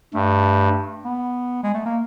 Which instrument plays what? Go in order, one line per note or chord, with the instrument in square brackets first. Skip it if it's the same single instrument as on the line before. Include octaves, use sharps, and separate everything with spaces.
[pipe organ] G2 [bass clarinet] A3
[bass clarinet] B3
G#3
A3
A#3